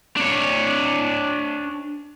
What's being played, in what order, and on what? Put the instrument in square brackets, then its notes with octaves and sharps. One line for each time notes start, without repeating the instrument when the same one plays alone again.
[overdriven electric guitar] D4 C#5